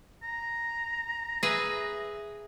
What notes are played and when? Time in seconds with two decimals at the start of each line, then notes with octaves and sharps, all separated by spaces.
0.23 A#5
1.43 G#4 B4 E5